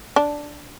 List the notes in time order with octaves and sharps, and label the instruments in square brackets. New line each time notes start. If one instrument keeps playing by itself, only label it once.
[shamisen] D4